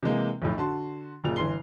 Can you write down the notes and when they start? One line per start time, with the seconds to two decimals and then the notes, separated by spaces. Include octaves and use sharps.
0.03 C3 E3 G#3 A#3
0.42 B1 F2 A2
0.57 D3 F#4 A5 C6
1.24 F#1 A#2 F7
1.36 G1 E3 C6 C7 G7